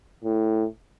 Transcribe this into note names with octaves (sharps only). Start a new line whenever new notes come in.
A2